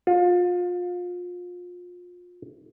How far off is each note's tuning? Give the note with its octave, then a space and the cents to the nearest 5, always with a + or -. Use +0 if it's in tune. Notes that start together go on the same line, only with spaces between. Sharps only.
F4 +30